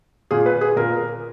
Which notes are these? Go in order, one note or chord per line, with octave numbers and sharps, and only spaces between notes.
A#2 G#4
B4
G#4
A#2 A#4